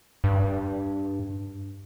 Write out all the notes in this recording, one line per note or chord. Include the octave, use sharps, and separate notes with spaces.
G2